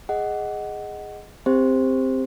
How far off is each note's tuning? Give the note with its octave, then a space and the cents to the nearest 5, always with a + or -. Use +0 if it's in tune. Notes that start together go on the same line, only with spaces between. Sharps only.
G#4 +0 D#5 +0 F#5 +10
C4 +0 G4 +25 C5 +0